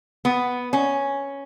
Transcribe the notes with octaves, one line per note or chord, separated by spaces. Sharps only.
B3
C#4